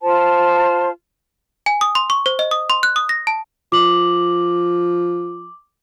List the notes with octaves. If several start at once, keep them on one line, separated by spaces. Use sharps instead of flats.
F4 C5 A5
G#5
D#6
C6
C#6
C5
D#5
D#6
C6
F#6
D#6
A#6
A5
F3 D6 F#7